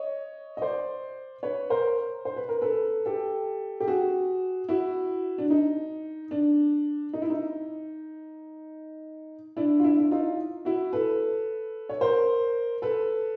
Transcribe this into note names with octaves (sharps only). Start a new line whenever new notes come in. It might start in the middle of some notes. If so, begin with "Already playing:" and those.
Already playing: C#5 D#5
D#5
C5 D5
B4 C#5
A#4 C5
C5
B4
A#4
A4 B4
G4 A4
G4
F#4 G#4
E4 F#4
D4
D#4
D4
D#4
E4
D#4
D4 E4
F4
D4 E4
E4
D#4 F4
E4 F#4
A4 B4
C#5
A#4 C5
A4 B4